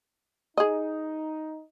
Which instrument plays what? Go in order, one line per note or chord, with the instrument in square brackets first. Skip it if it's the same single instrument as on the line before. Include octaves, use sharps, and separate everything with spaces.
[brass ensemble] D#4 [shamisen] G#4 D#5